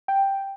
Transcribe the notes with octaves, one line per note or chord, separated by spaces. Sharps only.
G5